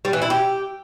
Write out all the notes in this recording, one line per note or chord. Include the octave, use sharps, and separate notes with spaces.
G3
E3
E4
G4